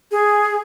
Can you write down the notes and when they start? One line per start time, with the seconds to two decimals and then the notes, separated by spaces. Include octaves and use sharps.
0.12 G#4